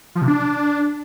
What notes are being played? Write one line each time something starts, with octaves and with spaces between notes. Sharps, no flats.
F3
C3
D4